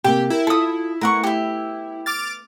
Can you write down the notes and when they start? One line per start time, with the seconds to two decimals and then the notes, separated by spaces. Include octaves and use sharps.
0.04 C3 A#3 G4 G5
0.30 E4 A#4
0.47 F4 A4 D#6
1.01 A3 B3 A#4 F#5 C#6
1.24 G4 E5
2.06 D6 F6 A6